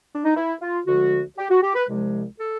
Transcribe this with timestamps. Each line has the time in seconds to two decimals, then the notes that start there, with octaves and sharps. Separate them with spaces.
0.14 D4
0.25 D#4
0.37 E4
0.62 F4
0.86 D2 D3 F3 G#3 F#4
1.38 G4
1.51 F#4
1.63 G4
1.75 B4
1.88 C2 C3 F3 G#3
2.39 A4